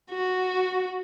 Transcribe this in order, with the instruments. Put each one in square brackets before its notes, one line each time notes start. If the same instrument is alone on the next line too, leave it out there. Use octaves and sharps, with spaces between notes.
[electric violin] F#4